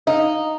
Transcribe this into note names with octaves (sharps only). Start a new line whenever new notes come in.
D#4 D#5 F5